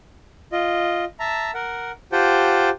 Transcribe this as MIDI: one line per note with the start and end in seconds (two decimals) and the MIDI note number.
0.52 1.04 65
0.52 1.04 75
1.20 1.51 76
1.20 1.51 81
1.20 1.51 82
1.54 1.92 70
1.54 1.92 78
2.12 2.70 65
2.12 2.70 67
2.12 2.70 72
2.12 2.70 78
2.12 2.70 79
2.12 2.70 81